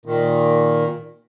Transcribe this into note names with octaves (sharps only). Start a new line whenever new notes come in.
A#2 D#3